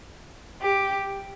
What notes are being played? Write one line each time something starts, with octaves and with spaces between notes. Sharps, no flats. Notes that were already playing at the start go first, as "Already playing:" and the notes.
G4